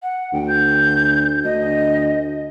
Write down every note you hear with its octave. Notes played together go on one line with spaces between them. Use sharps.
F#5
D2 G5
G6
D2 D#5